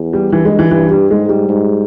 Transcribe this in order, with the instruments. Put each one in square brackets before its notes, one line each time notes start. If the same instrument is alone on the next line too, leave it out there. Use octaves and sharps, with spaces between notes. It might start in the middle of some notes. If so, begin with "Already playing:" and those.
Already playing: [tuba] E2
[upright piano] G3
[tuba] G2 [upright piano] E3
[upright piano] G#3
E3
[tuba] G2 [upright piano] E3
[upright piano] G3
[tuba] G#2 [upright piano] G#3
[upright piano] G3
[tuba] G#2